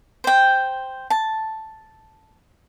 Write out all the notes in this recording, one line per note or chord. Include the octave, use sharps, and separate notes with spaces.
C5 G5
A5